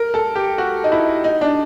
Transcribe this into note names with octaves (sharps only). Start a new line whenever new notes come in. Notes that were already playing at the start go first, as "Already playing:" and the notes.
Already playing: A#4
A4
G4
F#4
D#4
E4
D#4
D4